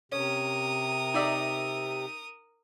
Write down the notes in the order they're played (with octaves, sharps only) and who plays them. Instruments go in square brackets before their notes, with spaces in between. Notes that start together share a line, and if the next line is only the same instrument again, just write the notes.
[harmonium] C3 [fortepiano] C#4 [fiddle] A#4 D#6
[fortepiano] D#4 D5 E5